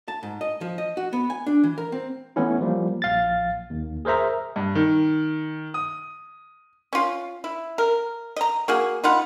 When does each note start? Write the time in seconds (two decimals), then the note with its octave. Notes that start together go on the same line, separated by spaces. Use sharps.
0.08 A5
0.23 G#2
0.41 D#5
0.61 F3
0.78 D#5
0.97 F#4
1.13 B3
1.30 G#5
1.47 D4
1.64 E3
1.78 A#4
1.92 C4
2.36 E3 A3 B3 C#4 E4
2.61 F3 G3 A#3
3.02 A#1 F5 A6
3.70 D#2
4.05 G#4 A#4 C5 E5 A#5
4.56 G2
4.75 D#3
5.74 D#6
6.93 C#4 F4
7.44 E4
7.78 A#4
8.36 D#5 A#5
8.68 A#3 F#4 G#4
9.04 D#4 F4 F#5 B5